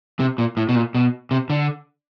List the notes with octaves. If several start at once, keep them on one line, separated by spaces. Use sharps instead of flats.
C3
A#2
A2
B2
A#2
B2
C3
D3